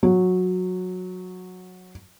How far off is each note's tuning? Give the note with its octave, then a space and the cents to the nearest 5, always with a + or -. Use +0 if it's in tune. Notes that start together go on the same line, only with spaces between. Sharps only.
F#3 -15